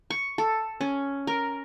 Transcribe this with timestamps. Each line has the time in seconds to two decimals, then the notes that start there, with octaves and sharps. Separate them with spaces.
0.10 C#6
0.38 A4
0.81 C#4
1.27 A#4